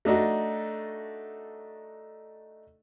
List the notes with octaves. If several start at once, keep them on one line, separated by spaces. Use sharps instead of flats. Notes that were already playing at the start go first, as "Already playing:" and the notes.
A3 D4 D#4 F#4